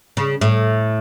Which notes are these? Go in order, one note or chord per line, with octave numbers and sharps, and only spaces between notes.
C#3
A2